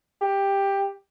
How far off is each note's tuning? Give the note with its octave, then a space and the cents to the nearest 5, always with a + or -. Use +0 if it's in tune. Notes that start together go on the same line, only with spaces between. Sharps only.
G4 +10